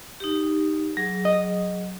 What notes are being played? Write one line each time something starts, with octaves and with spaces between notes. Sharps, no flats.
D#4 G4
F#3 G#4
D#5